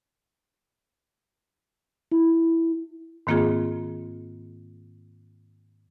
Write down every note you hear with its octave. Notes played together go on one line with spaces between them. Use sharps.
E4
G#2 D#3 A#3 C4 F4 G#4